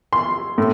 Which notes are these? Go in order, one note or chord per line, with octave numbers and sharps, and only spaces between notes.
C6
A2